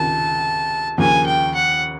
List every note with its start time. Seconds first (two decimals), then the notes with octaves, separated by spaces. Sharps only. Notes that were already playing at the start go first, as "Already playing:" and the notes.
Already playing: C#2 C3 D#3 A5
0.98 D#2 C#3 F3 A#3 G#5
1.27 G5
1.55 F#5